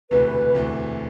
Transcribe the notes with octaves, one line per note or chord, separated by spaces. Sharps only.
E1 D2 C3 E3 A3 B4
E1 D2 C3 E3 A3